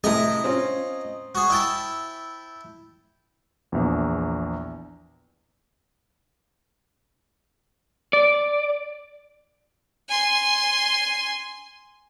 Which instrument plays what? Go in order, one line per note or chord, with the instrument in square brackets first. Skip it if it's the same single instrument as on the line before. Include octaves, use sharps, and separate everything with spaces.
[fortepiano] A2 C3 A3 [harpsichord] D#5 G#5 A#5
[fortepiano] C4 C#4 F4
[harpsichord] F#4 G#4
E4 G5 A5
[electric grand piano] A#1 E2
[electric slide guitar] D5
[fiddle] G#5 C6